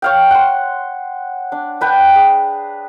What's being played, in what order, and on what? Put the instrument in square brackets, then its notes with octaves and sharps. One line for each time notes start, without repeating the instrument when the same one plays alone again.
[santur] C#5 F5 G5
F#5 C6
D4
D4 B4 G5
G#4